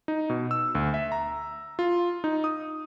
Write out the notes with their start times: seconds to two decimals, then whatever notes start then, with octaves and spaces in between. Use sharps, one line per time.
0.08 D#4
0.30 B2
0.51 E6
0.75 D2
0.94 E5
1.12 A#5
1.79 F4
2.24 D#4
2.44 D#6